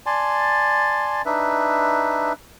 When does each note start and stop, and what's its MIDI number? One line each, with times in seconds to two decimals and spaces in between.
0.06 1.22 74
0.06 1.22 80
0.06 1.22 81
0.06 1.22 84
1.26 2.33 62
1.26 2.33 63
1.26 2.33 71
1.26 2.33 76